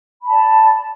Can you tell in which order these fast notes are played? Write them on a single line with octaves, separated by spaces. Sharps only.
B5 A5 D5